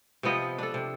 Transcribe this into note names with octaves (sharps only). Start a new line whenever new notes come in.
C3 F3 B3 D#5
D4 A4
C3